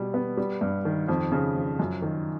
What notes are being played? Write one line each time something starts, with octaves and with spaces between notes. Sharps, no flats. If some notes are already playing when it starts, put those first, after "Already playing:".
Already playing: B2 G3
B3
G3
G2
D#3
F2
C#3
F3
F#2
D#3